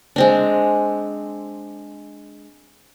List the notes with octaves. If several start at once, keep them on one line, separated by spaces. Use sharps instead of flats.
G#3 C4 D4